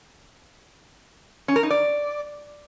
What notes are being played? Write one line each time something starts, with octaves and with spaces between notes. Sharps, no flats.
C#4
A#4
D#4
D5